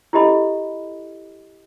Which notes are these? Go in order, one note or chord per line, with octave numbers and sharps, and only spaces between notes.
E4 G4 A4 D#5 B5